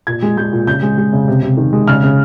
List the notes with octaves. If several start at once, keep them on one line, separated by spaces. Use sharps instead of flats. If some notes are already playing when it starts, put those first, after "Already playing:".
A#2 G#6
G#3
G#3 G6
A#2
C#3 G6
G#3
G#3
C#3
C3
C3
D#3
G#3
C#3 F6
C#3